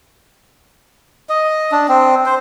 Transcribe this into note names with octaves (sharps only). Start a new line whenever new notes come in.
D#5
D4
C4
C5